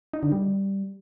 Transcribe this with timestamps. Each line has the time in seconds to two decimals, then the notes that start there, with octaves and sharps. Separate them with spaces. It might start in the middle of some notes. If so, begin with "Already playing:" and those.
0.13 D#4
0.23 D3
0.32 G3